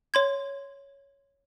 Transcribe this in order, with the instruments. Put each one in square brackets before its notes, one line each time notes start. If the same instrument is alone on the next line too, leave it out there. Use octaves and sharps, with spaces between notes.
[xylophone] C#5 C6 G#6